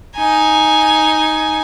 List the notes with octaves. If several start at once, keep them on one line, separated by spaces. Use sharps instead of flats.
D#4 G#5